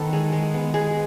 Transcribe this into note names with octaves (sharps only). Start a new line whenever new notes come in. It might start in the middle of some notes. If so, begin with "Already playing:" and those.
Already playing: D#3 B3 A4
G#3
G#3
B3
G#3 G#4